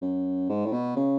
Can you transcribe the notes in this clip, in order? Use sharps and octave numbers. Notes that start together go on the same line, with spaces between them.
F#2
G#2
A2
B2
C#3